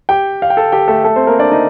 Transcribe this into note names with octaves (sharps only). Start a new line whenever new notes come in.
G4 G5
F5
G5
A4 A5
G4 G5
A3 A4
A3 A4
C4 C5
A#3 A#4
D4 D5
D#4 D#5